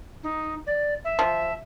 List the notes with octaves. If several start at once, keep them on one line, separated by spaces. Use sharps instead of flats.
D#4
D5
E5
F3